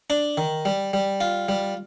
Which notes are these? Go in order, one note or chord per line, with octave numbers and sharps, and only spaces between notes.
D4
D#3
G3
G3
F4
G3